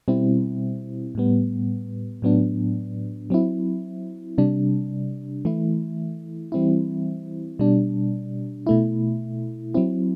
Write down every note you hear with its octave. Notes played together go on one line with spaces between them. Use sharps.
B2 G3 C4 E4
A2 G3 B3
A2 F#3 B3 D4
F#3 C4 E4
C3 G3 D4
E3 A3 E4
E3 G3 C4 E4
B2 G3 D4
B2 A3 E4
F#3 C4 E4